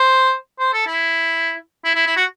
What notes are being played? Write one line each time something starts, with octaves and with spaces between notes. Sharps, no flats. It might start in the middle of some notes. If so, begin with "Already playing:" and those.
Already playing: C5
C5
A4
E4
E4
E4
E4
F#4